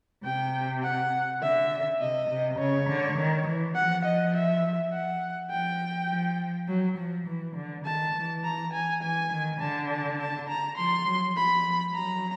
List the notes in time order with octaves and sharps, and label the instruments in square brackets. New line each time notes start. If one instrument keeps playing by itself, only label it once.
[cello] C3 [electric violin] G5
[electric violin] F#5
[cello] D3 [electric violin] E5
[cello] C3 [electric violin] D#5
[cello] C3
[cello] C#3 [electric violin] C#5
[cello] D3
D#3
E3
[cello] F3 [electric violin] F#5
[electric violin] D#5
E5
F#5
[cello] F3 [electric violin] G5
[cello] F3
F#3
F3
E3
D3
[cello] D#3 [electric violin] A5
[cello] E3
[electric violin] A#5
G#5
[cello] E3 [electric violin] G#5
[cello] D#3
[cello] D3 [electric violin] A5
[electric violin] A5
A5
A#5
[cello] F3 [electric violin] C6
[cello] F#3
[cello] F3 [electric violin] B5
[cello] F3
[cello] F#3 [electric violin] A#5